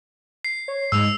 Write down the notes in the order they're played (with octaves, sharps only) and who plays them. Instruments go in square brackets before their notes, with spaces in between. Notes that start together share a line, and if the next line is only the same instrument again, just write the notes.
[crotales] C7
[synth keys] C#5
[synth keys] G#2 G#3 [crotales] E6 F7